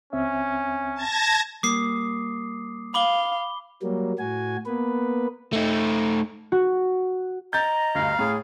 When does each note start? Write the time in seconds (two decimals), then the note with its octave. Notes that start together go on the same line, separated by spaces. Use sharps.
0.13 C#2 C4 C#4 E5
0.95 A5 G#6 A#6
1.63 G3 A#3 D6 D#6 C7
2.94 F5 B5 D6 G7
3.82 F#3 G3 A#3
4.19 A2 F#4 G#5
4.66 A#3 B3 B4
5.53 A3 D#4
6.52 F#4
7.53 D#5 A#5 G6 A6
7.95 D2 G2 F5
8.19 A2 G#4